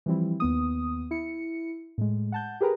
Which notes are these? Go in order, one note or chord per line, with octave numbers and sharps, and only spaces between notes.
E3 F3 G3 C4 E4
D#2 B3 D#6
E4 C#7
A2 G#3
F#5 A5 G6
G4 G#4 A#4 B4 G5 A#5